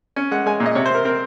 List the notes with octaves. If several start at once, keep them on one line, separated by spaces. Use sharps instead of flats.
C#4
G#3 F#5
G#3 G#5
A#2
D#5
C3 C#5
C5
C3 A#4
C4 A#4